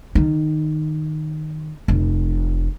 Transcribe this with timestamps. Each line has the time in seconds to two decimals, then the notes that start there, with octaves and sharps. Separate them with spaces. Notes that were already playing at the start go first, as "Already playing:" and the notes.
0.15 D#3
1.88 F1